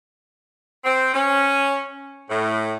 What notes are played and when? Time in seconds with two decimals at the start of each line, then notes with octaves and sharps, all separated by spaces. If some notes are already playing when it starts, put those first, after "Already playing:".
0.85 C4
1.14 C#4
2.30 A2